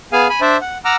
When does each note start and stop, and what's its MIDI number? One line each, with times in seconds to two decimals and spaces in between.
0.13 0.28 59
0.13 0.28 68
0.13 0.28 77
0.13 0.28 80
0.30 0.41 80
0.30 0.41 83
0.41 0.57 62
0.41 0.57 72
0.41 0.57 74
0.41 0.57 76
0.61 0.78 78
0.85 0.96 78
0.85 0.96 82
0.85 0.96 86
0.85 0.96 88
0.85 0.96 89